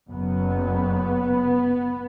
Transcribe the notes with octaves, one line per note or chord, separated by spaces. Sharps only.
F#1 F#2 B3